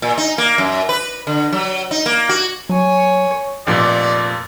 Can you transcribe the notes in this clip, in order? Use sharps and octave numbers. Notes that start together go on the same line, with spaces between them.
A#2
D#4
A#3
F#2
B4
D3
F#3
D#4
A#3
F#4
F#3 C#5 G#5
F1 F2 A#2 D5